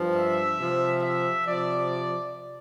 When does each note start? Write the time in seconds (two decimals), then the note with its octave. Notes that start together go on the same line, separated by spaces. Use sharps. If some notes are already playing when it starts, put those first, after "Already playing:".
Already playing: G2 F3
0.15 E5
0.58 C3 F3
1.02 E5
1.45 C3 F3 D5